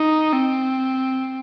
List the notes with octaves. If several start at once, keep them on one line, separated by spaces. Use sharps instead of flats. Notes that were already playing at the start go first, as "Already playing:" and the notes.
Already playing: D#4
C4